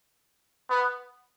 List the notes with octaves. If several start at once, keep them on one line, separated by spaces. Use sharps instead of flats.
B3